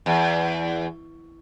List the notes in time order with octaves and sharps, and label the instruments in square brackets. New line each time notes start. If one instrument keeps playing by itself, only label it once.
[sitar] E2